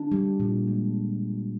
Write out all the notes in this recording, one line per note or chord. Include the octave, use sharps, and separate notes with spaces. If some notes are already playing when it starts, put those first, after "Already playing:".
Already playing: D4
G3
A#2
G#3